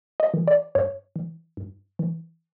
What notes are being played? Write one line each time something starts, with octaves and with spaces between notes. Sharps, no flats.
D#5
E3
D5
G2 C#5
E3
G2
E3